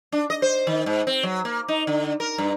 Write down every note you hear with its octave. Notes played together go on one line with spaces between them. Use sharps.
D4
D#5
C5
D#3
G#2
C4
F#3
A#3
D#4
D3
A#4
G2